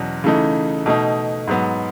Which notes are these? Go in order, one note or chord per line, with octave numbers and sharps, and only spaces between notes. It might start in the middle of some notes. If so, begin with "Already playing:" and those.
Already playing: E2 B2 F#3 C#4
C#3 E3 A3 D#4
B2 A3 D#4
G#2 F#3 B3